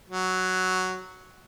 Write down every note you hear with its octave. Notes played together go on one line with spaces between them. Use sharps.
F#3